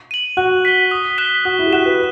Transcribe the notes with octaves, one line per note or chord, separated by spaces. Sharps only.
D#7 F#7
F#4 F#6
B6 D#7 G7
D#6
F#6 B6 E7 G7
F#4 D#6
E4
G4
F#4 F#6 B6 E7
B4